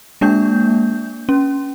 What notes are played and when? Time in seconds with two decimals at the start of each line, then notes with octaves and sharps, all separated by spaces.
0.21 G#3 A#3 D4 G6
1.29 C#4